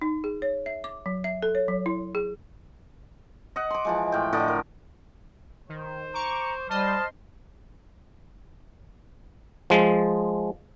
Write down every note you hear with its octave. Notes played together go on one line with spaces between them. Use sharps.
D#4
G#4
C#5
E5
D6
F#3
E5
A4
C#5
F#3
E4
G#4
D#5 F#5
C6 D6
E3 F3 G#3
A2 G5
A2 D3 D5 D#5
A#4
D#3 C5
A#5 C#6 D6
G3 C5 D#5 A5 C6 F6
F3 G#3